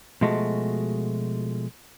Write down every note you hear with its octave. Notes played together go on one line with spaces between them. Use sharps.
B2 F3 G#3 A3 F#4